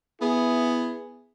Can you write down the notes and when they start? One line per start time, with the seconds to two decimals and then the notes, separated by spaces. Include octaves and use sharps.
0.21 B3 E4 G#4